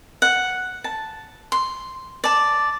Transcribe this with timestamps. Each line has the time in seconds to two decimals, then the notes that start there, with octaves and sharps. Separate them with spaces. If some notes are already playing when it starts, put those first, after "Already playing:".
0.22 F#5
0.84 A5
1.52 C6
2.24 D5 A5